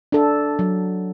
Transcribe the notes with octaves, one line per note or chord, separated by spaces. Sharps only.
D4 A4
F#3